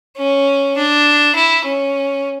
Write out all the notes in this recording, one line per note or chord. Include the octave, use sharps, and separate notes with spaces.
C#4
D4
E4
C#4